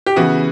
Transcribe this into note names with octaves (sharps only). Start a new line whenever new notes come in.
G4
C#3 E3 B3 F#4